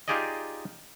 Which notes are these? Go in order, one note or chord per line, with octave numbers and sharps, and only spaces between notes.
D#4 F4 G4 G#4 D5 D#5